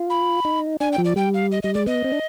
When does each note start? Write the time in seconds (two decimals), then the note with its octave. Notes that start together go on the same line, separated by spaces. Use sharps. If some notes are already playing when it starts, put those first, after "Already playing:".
Already playing: F4
0.10 B5
0.45 D#4
0.80 D4 G#5
0.92 G5
0.98 F3
1.04 D5
1.16 G3 G5
1.34 F5
1.51 D#5
1.63 G3 D#5
1.74 G#3 D5
1.86 B3 D#5
2.04 C4
2.12 D4